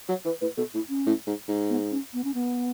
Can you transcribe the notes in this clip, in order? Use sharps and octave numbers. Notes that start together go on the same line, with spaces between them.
F#3 C#5
E3 B4
A2 B4
B2 A4
A2 E4
C#4
A2
G#2
G#2
B3
C#4
B3
C#4
B3